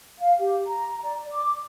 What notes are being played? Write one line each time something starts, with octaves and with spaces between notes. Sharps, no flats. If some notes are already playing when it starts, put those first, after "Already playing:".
F5
G4
A#5
D5
D6